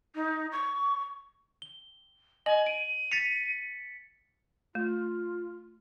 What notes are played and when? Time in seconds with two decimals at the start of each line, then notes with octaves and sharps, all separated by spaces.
0.15 D#4
0.52 C#6
1.62 G7
2.46 D#5 G#5 F#7
2.66 D7 D#7
3.12 A6 B6 C#7 F7
4.75 A3 F4